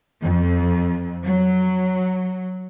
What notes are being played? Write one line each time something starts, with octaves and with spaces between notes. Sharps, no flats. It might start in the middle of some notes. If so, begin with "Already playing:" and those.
F2
F#3